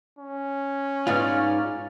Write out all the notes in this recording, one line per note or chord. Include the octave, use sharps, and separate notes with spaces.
C#4
G#2 B3 D#4 F4 D5 F6